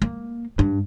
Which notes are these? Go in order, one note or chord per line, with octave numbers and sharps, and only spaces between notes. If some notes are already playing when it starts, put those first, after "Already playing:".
A#3
G2